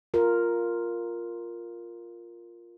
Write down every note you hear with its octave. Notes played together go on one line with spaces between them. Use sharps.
F4 A#4